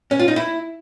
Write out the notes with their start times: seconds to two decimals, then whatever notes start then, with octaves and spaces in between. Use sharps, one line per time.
0.11 C#4
0.19 F4
0.28 D#4
0.36 E4